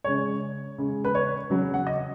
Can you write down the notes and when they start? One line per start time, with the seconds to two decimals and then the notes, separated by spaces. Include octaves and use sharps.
0.04 C#3 G#3 C#5
0.78 C#3 G#3
1.05 B4
1.15 C#5
1.50 C#3 F#3
1.74 F#5
1.87 D#5